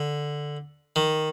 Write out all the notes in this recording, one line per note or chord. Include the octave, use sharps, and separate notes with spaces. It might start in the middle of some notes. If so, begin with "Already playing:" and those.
Already playing: D3
D#3